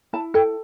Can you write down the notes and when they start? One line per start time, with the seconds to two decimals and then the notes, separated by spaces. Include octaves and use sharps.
0.13 E4 A5
0.34 A4 G5